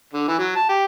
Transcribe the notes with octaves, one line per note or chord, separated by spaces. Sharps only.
D3
E3
F#3
A5
G4